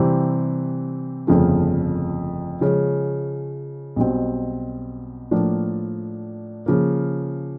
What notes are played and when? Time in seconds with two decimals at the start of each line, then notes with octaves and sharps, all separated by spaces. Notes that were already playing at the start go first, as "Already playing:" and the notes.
Already playing: C3 E3 G3 C4
1.27 G1 F2 C#3 F3 A3
2.61 C#3 F3 G#3 C#4
3.96 B1 B2 G3 C4
5.31 A2 F3 A#3 D4
6.66 C#3 F3 A#3